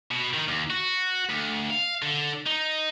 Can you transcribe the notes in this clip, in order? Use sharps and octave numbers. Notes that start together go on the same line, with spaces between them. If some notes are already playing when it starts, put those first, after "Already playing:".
B2
D#3
D#2
F#4
D2
F5
D3
D#4